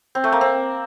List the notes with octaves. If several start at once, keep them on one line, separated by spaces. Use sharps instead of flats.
C4
A3
A#3
C4